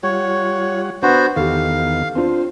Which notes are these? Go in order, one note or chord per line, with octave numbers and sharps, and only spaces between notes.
G3 F4 C#5 F#5
B3 D4 F#4 B4 C5 B5
E2 D#3 B3 G4 A4 F5
C4 D4 F4 C5